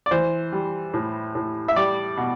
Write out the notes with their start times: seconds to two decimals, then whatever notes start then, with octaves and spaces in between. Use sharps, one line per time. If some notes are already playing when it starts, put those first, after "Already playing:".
0.06 D5
0.11 E3 C5
0.52 G3
0.94 A2
1.35 A2
1.68 E5
1.76 G3 D5
2.17 B2